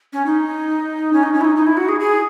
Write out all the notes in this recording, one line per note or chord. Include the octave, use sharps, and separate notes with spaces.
C#4
D#4
C#4
D#4
C#4
E4
D#4
D#4
E4
F#4
G#4
G#4